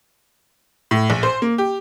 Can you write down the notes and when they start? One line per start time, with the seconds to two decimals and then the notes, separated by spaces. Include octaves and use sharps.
0.91 A2
1.10 A#1
1.23 C5
1.42 A#3
1.58 G4